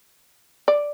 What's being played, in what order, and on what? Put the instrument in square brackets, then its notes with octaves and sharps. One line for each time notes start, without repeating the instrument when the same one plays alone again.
[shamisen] D5